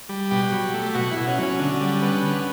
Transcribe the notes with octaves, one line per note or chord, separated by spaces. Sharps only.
G3
B2 G4
F#3
A3
B2 F#4
E4
B2
C#4
F#3 C#4
D3
G3
B3
D3